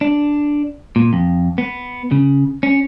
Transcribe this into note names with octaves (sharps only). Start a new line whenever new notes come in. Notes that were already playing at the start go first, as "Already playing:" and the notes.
D4
A#2
F2
B3
C#3
C#4